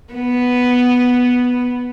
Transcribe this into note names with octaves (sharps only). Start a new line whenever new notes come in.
B3